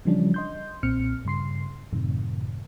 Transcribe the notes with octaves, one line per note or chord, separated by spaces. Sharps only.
C#3 E3 F3 G3 C#4 D4
D#5 C6 G6
B1 A#2 C4 F6 C#7
G2 C#3 C6 C7
F#2 A2 C3 D#3